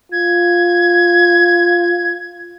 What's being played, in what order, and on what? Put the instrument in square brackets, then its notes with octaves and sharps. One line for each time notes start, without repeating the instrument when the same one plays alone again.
[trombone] F4 [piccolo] G#6